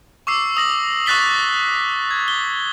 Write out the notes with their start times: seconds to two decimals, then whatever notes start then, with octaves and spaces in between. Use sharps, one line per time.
0.27 C#6 D6 E6 C7
0.57 D#6 A#6 F#7
1.06 C#6 D#6 F#6 A6 B6 G7
2.11 G#6
2.28 G7